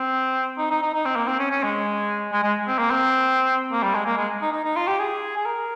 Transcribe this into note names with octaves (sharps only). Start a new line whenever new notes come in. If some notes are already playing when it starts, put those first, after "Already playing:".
Already playing: C4
D#4
D#4
D#4
D#4
C4
A#3
C4
C#4
C#4
G#3
G#3
G#3
C4
A#3
C4
A#3
G3
G#3
A#3
G#3
D#4
D#4
D#4
F4
G4
G#4
G#4
A#4